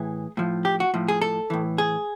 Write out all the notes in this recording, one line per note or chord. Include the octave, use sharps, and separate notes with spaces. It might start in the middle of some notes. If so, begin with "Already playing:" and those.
Already playing: A2 E3 G#4
A2 F3
G4
F#4
A2 F3
G#4
A4
A2 E3
G#4